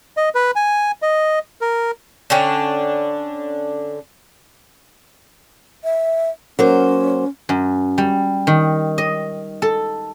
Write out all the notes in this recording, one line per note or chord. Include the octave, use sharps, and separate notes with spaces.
D#5
B4
G#5
D#5
A#4
D3 C#4 D4 G5
E5
F#3 A#3 C#4 C5
F#2
G3
D#3
D#5
A4